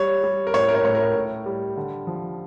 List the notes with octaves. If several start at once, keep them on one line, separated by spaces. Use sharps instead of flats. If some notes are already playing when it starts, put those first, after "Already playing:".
Already playing: G3 C#5
G3
A#4
A2 C#5
A#4
C#5
A2 C#5
A#4
A2
G3
D3
F3